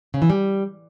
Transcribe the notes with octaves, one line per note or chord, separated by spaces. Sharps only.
C#3
E3
G3